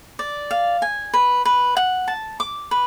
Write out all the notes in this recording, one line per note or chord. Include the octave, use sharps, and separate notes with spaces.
D5
F5
G#5
B4
B4
F#5
A5
D6
B4